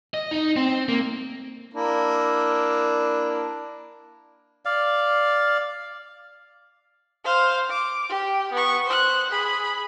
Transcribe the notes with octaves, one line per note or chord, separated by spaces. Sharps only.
D#5
D#4
C4
A#3
A#3 D4 E4
D5 F5
C5 F5
D6
G4
B3 C#6
C5 F#6
G#4 B5